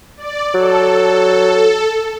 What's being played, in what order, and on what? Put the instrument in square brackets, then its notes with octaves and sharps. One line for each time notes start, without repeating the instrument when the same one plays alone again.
[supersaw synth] D5
[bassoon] F#3 [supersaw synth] A4